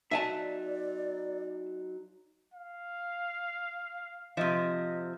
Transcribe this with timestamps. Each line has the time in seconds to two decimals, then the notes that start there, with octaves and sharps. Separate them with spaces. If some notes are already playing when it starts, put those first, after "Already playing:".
0.11 F#3 D#4 D5 E5 G#5 A5
2.54 F5
4.37 C3 F3 D#5 E5